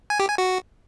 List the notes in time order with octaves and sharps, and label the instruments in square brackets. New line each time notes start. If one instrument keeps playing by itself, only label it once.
[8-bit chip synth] G#5
G4
G#5
F#4